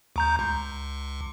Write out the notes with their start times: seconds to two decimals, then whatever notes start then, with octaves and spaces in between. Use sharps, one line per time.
0.16 D2 A#5 G6
0.39 C#2